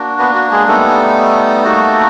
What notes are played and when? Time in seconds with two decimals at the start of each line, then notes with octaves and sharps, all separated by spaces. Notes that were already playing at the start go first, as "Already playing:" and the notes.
Already playing: A#3 D4 F#4
0.19 B3 B4
0.35 F#4
0.52 G#3 G#4
0.67 G3 A3 B3 D#4 A4
1.64 A#3 D#4 F#4